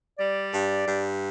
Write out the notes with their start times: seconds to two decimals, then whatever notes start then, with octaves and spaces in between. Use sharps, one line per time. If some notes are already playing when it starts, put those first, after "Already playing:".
0.18 G3 D5
0.52 G2
0.87 G2